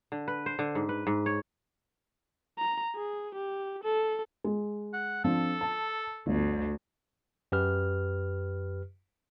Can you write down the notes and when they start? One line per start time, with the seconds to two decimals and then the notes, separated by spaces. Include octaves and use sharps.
0.12 D3
0.28 B4
0.46 C5
0.59 D3
0.75 G#2
0.89 B4
1.07 G#2
1.26 C#5
2.58 A#5
2.96 G#4
3.35 G4
3.84 A4
4.44 G#3
4.93 F#5
5.24 F3 C4 D4 A4
5.61 A5
6.27 G1 D2
7.52 F#2 G4 B4 F6